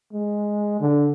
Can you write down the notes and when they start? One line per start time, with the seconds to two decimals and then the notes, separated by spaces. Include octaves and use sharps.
0.13 G#3
0.80 D3